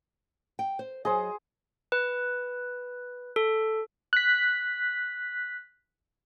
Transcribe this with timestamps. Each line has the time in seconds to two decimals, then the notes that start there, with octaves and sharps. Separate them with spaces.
0.59 G5
0.79 C5
1.05 F#3 G#4 C5 D#5
1.92 B4
3.36 A4
4.13 F#6 B6